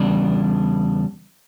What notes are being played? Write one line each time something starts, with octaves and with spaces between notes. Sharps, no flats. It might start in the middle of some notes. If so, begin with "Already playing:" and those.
Already playing: E2 C#3 G3 D4